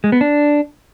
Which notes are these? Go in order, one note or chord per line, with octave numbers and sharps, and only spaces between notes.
G#3
B3
D4